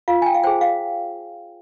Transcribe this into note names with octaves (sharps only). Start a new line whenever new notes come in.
F4 F5
G#5
G5
F5
G#4 C5 G5
F5